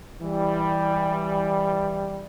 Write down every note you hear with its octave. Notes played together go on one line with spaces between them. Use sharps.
E3 G3